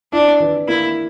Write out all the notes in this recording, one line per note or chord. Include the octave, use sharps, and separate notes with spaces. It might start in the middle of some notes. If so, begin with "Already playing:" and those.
D4 E4
E3
A#3 E4